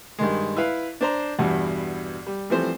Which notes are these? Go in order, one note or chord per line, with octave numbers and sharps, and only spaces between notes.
G2 D#3 G#3
E4 B4 F5
D4 C5 A#5
E2 G2 B2 F#5
G3
E3 F3 G3 A3 C4 C5